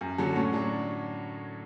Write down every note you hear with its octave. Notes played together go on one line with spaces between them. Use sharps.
F#2
D3 F#3 A4
A2 C#4
F#3 D4